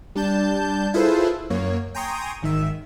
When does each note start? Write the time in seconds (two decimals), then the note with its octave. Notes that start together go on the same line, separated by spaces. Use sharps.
0.15 G3 D4 A5 G6
0.94 E4 F4 G#4 A4 B4 C5
1.50 F#2 A#3 C#5
1.94 G5 G#5 A#5 C6 C#6 D#6
2.42 G#1 D#3 E5